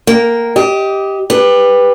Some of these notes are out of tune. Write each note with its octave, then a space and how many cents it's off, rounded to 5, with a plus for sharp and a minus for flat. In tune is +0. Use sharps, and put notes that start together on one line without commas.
A#3 +0 G5 -25
G4 +0 D#5 +25
G4 +20 B4 +0